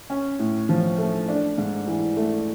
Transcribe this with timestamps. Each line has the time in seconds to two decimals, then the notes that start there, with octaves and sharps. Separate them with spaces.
0.10 C#4
0.39 A2
0.69 F3
0.98 A3
1.29 D4
1.58 G#2
1.88 E3
2.17 A3